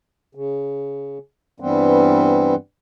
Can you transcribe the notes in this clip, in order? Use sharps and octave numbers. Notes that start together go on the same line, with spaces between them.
C#3
G2 E3 G3 B3 C4